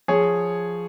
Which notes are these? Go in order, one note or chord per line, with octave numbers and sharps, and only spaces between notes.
F3 G#4 C#5